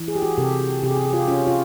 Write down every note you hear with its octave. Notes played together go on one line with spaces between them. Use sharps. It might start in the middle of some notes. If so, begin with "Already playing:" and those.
Already playing: E3
G#4
G4
F#4 G#4
C3 G4 A4
C3 G4
G#4
G4
G#4
F4 G4
C#4 F4
F4